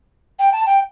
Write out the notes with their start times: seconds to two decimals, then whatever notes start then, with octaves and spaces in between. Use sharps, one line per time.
0.39 G5
0.53 A5
0.66 G5